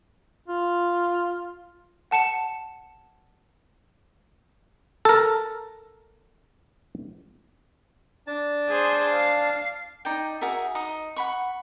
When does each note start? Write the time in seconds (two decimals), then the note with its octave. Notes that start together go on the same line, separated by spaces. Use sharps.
0.48 F4
2.11 F#5 A5 C#7 E7
5.05 A4 A#4
8.27 D4 A5
8.69 G#4 C5
9.10 F5 C7
10.05 D#4 D5 G5
10.41 F#4 G#4 A#4 E5
10.75 D#4 D#6
11.16 F#5 B5 C#6